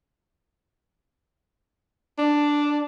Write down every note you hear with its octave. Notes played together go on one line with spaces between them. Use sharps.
D4